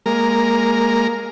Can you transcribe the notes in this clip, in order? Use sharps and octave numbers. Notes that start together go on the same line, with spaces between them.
G#3 A#3 A#4